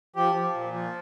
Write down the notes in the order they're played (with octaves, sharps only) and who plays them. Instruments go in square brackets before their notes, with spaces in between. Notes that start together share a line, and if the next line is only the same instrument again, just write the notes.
[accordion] F3 G4
F3
A#2
F3